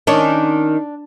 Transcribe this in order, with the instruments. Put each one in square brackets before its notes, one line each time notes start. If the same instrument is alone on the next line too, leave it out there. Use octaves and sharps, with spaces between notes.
[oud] D#3 C#4 [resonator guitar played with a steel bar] D4